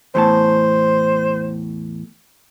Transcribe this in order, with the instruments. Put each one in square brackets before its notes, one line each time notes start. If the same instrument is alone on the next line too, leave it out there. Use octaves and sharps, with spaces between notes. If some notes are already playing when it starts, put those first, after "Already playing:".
[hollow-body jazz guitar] E2 A2 A5 [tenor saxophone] C5